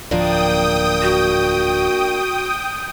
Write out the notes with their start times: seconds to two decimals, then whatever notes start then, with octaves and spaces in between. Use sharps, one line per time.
0.11 D1 F3 A#3 D4 G5 D#6
1.02 F#4